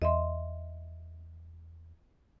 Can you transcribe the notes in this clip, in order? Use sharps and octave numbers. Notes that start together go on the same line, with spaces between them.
E2 D#5 E5 C6